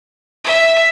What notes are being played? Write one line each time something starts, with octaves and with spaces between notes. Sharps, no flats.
E5